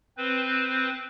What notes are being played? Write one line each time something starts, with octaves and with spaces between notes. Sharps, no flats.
C4 B4 C5